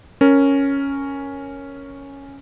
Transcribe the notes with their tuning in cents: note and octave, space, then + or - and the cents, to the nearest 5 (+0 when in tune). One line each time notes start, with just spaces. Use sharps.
C#4 +0 A#4 +0